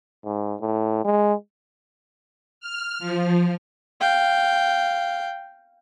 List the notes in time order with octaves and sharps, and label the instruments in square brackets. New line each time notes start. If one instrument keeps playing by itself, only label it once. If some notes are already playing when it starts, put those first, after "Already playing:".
[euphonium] G#2
A2
G#3
[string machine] F6
F3
[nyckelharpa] F5 G5